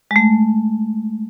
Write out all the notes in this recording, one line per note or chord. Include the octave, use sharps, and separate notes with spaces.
G#3
A3